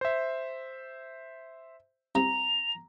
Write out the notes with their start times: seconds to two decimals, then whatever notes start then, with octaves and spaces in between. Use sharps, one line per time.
0.01 C5 E5
2.15 C2 C3 C4 A#5 F7